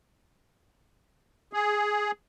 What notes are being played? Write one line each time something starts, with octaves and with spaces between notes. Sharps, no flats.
G#4